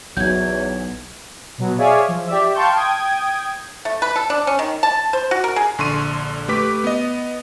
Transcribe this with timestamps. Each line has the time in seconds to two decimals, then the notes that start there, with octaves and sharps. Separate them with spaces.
0.17 B1 E2 F#3 G6 G#6
1.58 B2 F#3 B3
1.78 G#4 C#5 D5 E5 F5 G#5
2.08 F3
2.27 G4 D5 E5
2.54 F5 G5 A5 C6 C#6 G6
2.76 G5 D#6 G#6
3.85 A3
4.02 B4
4.16 A4
4.30 D4
4.47 C#4
4.59 D#3
4.83 A5
5.13 C5
5.31 F#4
5.44 A#4
5.56 G#4
5.78 A#1 D3 C6 C#6 D#7
6.48 A3 G4 B4 D6 B6
6.84 B3 D#5